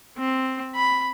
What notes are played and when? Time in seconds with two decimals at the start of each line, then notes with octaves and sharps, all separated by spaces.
0.18 C4
0.75 B5